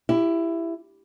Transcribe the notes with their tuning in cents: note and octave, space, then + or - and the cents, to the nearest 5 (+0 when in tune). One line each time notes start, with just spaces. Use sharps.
E4 +15 G4 +0